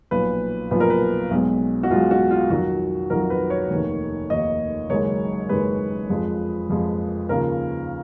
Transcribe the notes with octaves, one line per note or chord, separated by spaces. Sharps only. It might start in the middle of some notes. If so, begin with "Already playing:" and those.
B1 A#2 F3 B4
B1 A#2 F3 B4
A#4
B4
B1 B2 G#3
F#4
B1 B2 G#3 F4
F#4
F4
F2 D#3 F#3 F#4
F2 D#3 F#3 A#4
B4
C#5
F1 D#2 D#3
F1 D#2 D#3 D#5
F#1 F#2 D#3 G#3 C#5
F#1 F#2 D#3 G#3 B4
F2 F3 G#3
F2 F3 G#3
D#2 C#3 F3 A#4